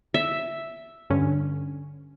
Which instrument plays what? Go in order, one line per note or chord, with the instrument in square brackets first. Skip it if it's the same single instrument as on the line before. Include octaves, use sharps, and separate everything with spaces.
[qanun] E5
[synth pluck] G2 D3 C#4